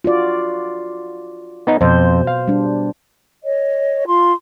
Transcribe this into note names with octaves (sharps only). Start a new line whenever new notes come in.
F4 F#4 D5
B3 D#4
F2 B2 C5
F5
G3 D4
C#5 D#5
F4 C6